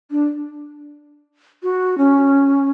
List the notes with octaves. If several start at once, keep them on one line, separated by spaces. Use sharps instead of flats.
D4
F#4
C#4